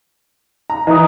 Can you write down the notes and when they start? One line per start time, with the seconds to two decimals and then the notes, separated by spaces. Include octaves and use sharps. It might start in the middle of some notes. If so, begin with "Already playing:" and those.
0.70 A#5
0.87 E3 D#5 A#5 D#6